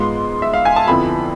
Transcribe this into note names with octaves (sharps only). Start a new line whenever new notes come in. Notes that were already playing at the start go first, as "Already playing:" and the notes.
Already playing: G#2 G#3 B3 F4 C6
E5
F5
G#5
A5
F2 D3 F3 B3 E4 B5